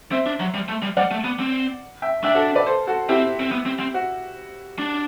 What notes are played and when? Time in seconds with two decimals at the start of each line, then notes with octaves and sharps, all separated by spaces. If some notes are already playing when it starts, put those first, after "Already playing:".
0.11 C4 C5 E5
0.26 D4
0.40 F#3
0.54 G3
0.68 A3
0.82 G3
0.97 G3 D5 F#5
1.11 A3
1.24 B3
1.40 C4
2.02 E5 G5
2.24 D4 E5 G5
2.35 F#4 A4
2.55 B4 D5
2.66 A4 C5
2.87 F#4 A4
3.09 C4 E4 G4
3.40 C4
3.51 B3
3.66 C4
3.80 C4
3.94 F#4
4.78 D4